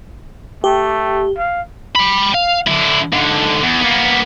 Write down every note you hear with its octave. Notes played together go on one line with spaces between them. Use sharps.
A3 G4
F5
G5 B5
F5
D3 E4
G#2 D3
E2
A#3 B3